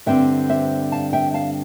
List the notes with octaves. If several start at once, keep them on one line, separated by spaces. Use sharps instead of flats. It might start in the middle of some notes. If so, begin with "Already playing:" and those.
G2 D3 G3 C4 E5 G5
C5 E5
F5 A5
E5 G5
F5 A5